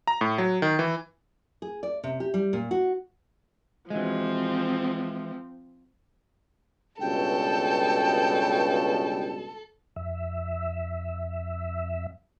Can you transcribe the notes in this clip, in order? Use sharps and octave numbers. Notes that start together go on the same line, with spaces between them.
A#5
A2
F#3
D#3
E3
G#4
D5
C3
G4
G3
A#2
F#4
E3 F3 G#3 C4
C#2 G2 B2 A4 G5
F2 E5